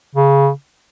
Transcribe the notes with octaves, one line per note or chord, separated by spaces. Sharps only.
C#3